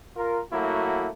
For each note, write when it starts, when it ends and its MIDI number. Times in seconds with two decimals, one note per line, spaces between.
0.16 0.40 65
0.16 0.40 70
0.52 1.09 54
0.52 1.09 57
0.52 1.09 58
0.52 1.09 64
0.52 1.09 66